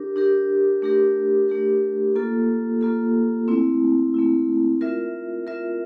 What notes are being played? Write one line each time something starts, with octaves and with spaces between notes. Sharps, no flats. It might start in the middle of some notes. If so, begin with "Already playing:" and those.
Already playing: D4 G4 A#4
D4 G4 A#4
A3 D4 G4 A#4
A3 D4 G4 A#4
A#3 F4 A4
A#3 F4 A4
A3 C4 E4
A3 C4 E4
F4 A#4 E5
F4 A#4 E5